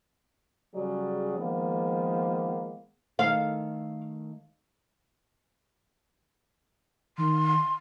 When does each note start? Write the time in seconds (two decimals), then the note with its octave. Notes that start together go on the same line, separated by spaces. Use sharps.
0.74 C#3 F#3 G3 G#4 D5
1.37 D#3 F3 G#3 A#3 B3
3.19 D#3 A3 E5 F5
7.18 D#3 C6